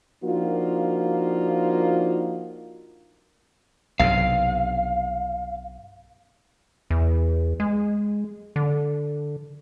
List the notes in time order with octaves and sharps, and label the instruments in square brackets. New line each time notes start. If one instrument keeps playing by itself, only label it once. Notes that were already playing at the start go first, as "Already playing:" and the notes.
[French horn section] F3 A#3 D4 D#4 F4 F#4
[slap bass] B1 G2 C3 [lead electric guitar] F5
[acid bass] E2
G#3
D3